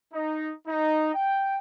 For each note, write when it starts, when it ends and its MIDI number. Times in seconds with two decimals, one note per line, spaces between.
0.14 0.53 63
0.68 1.15 63
1.15 1.58 79